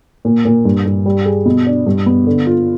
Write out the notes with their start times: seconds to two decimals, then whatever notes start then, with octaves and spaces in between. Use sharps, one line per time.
0.25 A#2
0.45 A#2
0.65 G2
0.85 G2
1.06 G3
1.26 G#4
1.46 B2
1.67 D4
1.86 G2
2.06 B3
2.27 D3
2.47 F4